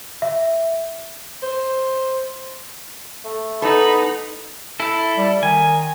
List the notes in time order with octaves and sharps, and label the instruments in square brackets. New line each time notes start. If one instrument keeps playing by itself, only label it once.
[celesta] E5
[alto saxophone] C5
[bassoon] A3
[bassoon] B3 [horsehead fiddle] D#4 [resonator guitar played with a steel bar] A4 [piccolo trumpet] B5
[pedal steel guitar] E4 A4
[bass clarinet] G3
[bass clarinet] D#3 [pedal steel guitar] G#5